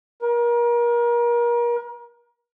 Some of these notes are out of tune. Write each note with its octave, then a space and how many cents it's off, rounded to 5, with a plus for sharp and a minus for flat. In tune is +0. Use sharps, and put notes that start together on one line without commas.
A#4 +35